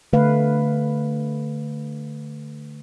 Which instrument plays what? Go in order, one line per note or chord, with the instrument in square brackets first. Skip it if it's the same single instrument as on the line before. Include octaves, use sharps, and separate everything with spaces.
[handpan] D3 A3 B4 F5